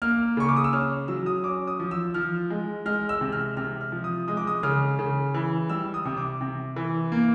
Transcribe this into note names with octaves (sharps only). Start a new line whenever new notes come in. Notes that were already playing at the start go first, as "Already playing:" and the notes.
A#3 F6
C#3 C#6
D6
D#6
E6
C#4 F6
F#3 E6
D#6
C#4 D6
D#6
F3
E6
F3 F6
G#3
G#3 F6
E6
C3
F6
C3 F6
F6
F3
D#6
G#3 D#6
D6
D#6
C#3 F6
C#3
E3
G3 E6
D#6
C3
D6
C3
E3
A#3